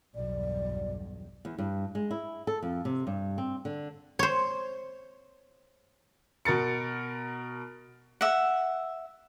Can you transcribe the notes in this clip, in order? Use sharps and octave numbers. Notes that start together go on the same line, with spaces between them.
B1 E2 G2 D5
E2
G2
G#3
E4
A4
F2
C3
G2
C4
D3
C5 C#5
B2 A#4 A6 C#7
E5 F#5